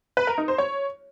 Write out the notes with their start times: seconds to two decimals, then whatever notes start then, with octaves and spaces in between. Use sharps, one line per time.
0.17 B4
0.27 A#4
0.38 D#4
0.48 C5
0.58 C#5